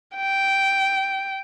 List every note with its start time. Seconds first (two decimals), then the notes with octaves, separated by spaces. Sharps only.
0.16 G5